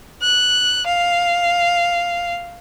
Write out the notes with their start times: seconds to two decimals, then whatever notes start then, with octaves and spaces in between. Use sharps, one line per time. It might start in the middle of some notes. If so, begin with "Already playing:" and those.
0.22 F#6
0.86 F5